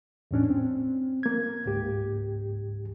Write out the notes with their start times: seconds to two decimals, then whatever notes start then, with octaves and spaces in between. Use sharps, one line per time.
0.31 E2 A2 C#4 D4
0.50 C4
1.23 A#3 G#6
1.65 C#2 G#2 G4